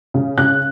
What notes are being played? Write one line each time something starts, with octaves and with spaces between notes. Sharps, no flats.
C#3
C#3 F#6